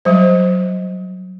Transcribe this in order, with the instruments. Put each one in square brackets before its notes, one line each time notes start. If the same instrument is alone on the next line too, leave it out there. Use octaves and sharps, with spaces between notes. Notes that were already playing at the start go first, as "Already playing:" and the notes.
[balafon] F#3 G3 C5